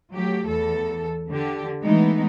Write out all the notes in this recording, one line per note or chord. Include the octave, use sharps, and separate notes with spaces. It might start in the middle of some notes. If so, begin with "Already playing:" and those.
F#3 A3 G4
E2 A4
D3 G4
E3 G#3 A3 B3 D#4